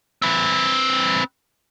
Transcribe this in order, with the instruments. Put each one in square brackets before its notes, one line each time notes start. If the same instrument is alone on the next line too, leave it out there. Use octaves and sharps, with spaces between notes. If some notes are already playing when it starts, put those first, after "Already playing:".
[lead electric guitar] C4 B4